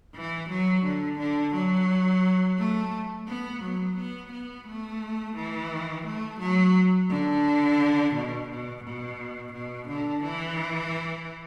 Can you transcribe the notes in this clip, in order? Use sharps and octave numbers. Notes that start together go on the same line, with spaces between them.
E3
F#3
D3
D3
F#3
A3
B3
F#3
B3
B3
A3
E3
A3
F#3
D3
B2
B2
B2
B2
D3
E3